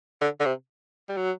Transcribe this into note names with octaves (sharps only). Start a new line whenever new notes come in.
D3
D3
C3
G3
F#3